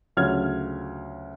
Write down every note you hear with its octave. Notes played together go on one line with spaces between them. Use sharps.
D2 C#3 F#3 F4 F6 G#6